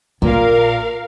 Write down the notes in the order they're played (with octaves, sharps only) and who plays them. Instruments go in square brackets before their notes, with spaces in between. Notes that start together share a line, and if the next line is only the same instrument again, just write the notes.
[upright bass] A#1 [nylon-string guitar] A#2 [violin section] A#4 F5